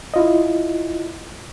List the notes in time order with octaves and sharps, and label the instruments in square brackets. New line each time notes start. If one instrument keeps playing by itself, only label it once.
[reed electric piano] E4 F4 D#5